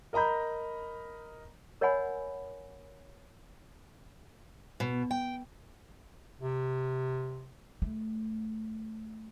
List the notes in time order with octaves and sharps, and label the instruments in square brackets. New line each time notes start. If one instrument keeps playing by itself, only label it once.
[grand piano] A#4 D#5 A#5 B5 G6
[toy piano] A#4 C#5 D#5 F#5 G#5 B5
[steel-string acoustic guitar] B2
G5
[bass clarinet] C3
[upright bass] A3